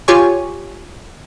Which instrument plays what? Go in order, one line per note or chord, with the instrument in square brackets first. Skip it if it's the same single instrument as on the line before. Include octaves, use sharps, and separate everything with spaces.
[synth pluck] F4 G4 C#5 G#5 C#6